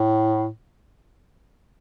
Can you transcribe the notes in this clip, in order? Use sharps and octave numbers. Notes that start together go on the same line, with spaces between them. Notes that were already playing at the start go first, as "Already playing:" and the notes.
Already playing: A2